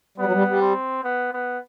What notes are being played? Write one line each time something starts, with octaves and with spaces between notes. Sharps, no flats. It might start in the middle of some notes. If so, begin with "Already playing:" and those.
G3 B3
F#3
G3
G3
C4
B3
B3